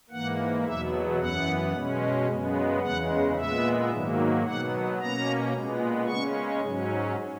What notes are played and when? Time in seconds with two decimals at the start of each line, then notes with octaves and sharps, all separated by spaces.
0.10 G#2 E3 A#3 F#5
0.65 E2 B2 F#3 B3 E5
1.19 F#2 E3 B3 F#5
1.73 B2 G#3 C#4
2.27 F#2 C#3 G#3 B3
2.82 E2 C#3 G#3 F#5
3.35 A#2 G#3 B3 E5
3.90 G#2 D#3 F#3 A#3
4.45 B2 F#3 B3 F#5
4.99 B2 A#3 C#4 A#5
5.53 A#2 G#3 B3
6.07 C#3 G#3 C#4 C#6
6.61 G#2 F#3 C#4